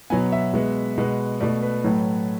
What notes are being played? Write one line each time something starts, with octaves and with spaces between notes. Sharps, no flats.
B2 F#3 B3 G#5
E5
B2 G#3 B3
B2 G#3 B3
B2 A3 D5
B4
A2 F#3 A3